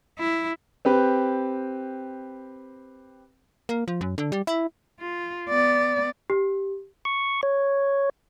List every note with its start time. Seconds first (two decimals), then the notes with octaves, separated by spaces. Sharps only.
0.19 E4
0.85 C4 G4 B4
3.69 A#3
3.88 F3
4.01 F#2
4.18 D3
4.32 G3
4.47 E4
5.00 F4
5.49 B3 D5
6.30 G4
7.05 C#6
7.43 C#5